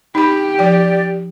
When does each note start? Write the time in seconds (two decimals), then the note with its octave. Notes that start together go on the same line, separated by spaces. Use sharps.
0.15 D#4 G4 B5
0.59 F3 D5 G5